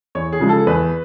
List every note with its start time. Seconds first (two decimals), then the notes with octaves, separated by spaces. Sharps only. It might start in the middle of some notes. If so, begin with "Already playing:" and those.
0.15 E2 C#5
0.32 G#4
0.40 C#3 F3 G#3
0.49 A4
0.67 E2 B4